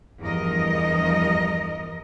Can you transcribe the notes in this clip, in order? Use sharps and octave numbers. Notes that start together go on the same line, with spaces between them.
E2 G2 F3 A#4 D#5